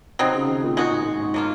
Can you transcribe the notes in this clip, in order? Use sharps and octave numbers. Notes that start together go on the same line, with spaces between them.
C3 F#3 C4 D#4
C#3
D#3
A#2
A#2 G#3 D#4 F#4
G#2
G#2
G#2
F#3 A#3 F4